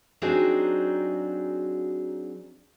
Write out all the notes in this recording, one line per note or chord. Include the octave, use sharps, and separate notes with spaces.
F#3 C4 D4 D#4 F#4 G#4